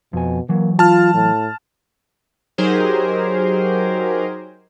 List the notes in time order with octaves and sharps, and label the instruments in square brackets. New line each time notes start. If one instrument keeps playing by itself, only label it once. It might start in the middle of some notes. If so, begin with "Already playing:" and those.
[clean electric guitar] F2 G#5 [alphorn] B2
[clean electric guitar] E3 F#3 [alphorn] A#3
[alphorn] F4 [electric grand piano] A5 F6
[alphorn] A2
[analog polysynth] F#3 D#4 G4 G#4 A#4 C5